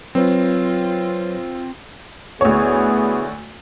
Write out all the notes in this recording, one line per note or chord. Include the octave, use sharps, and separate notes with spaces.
F#3 C4 F4 B4 C#5
D2 B3 E4 G#4 C#5